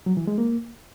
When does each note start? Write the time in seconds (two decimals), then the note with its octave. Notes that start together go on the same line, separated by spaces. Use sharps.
0.06 F#3
0.17 E3
0.27 G#3
0.38 A#3